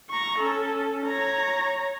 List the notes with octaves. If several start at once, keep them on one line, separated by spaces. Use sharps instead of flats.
A#5 C#6
C#4 A4
C#5 A#5